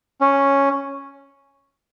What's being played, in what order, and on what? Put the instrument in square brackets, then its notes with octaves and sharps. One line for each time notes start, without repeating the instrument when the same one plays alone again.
[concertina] C#4